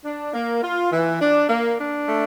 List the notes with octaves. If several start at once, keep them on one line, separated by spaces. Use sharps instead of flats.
D4
A#3
F4
E3
D4
A#3
D4
A3